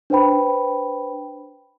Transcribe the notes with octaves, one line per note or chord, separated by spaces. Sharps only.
D4 B4 C5 G5 B5